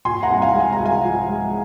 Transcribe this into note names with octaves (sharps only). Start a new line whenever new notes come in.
A#2 G#5 C6
F#5 A#5
C2
F5 G#5
G#3
G#5
A#5
C2
F5 G#5
F3
G#3